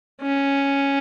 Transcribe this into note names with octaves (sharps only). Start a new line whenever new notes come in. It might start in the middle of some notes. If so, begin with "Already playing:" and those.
C#4